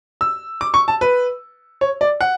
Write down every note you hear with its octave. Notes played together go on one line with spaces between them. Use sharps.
E6
D6
C#6
A5
B4
C#5
D5
F#5